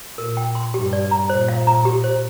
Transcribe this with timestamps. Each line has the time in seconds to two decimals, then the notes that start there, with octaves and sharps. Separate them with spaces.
0.18 A#2 A#4
0.37 G5
0.55 C6
0.74 G2 G4
0.93 D5
1.11 A#5
1.29 A#2 C5
1.48 F5
1.67 A#5
1.85 G4
2.04 C5